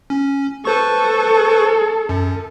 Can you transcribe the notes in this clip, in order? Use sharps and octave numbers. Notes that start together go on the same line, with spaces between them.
C#4
A4 B4 C5 C#6
F#2